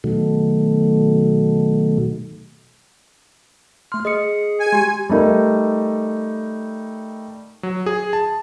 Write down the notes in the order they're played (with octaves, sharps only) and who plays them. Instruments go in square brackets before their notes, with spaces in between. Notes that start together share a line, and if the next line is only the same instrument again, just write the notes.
[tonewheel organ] B2 D#3 F#3 A3
[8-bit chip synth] A3 F6 [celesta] C6
[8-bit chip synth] G#4 [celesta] D#5 D#6 C#7
[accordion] G#5
[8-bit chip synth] G#3 [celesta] G4 C6
[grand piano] G3 A3 D#4 A#4
[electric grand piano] F#3
G#4
A5